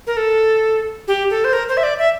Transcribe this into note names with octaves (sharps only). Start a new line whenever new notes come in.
A#4
A4
G4
A4
C5
A#4
C5
E5
D5
E5